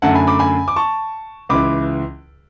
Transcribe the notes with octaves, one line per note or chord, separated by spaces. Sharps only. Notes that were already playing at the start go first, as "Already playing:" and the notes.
F#2 D3 A3 F#5 A5
G#5 B5
B5 D6
G#5 B5
D6
A5 C#6
C#2 C#3 E3 B5 D6